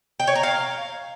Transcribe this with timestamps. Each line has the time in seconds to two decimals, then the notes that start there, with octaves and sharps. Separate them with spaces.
0.20 G5
0.27 C#5
0.35 A#5
0.43 F5